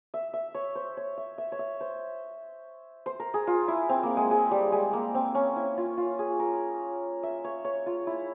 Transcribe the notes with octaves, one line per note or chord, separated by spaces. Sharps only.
E5
E5
C#5
C5
C#5
E5
E5
C#5
E5
C5
C5
A#4
G#4
F4
E4
C4
A#3
G#3
G#3
G3
G#3
A#3
C4
C#4
E4
F4
F4
G#4
A#4
E5
C#5
C#5
F4
E4